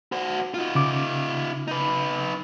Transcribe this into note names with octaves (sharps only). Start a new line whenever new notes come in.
F#4 C5
D#4 F4
C#3 D6
D#4 B4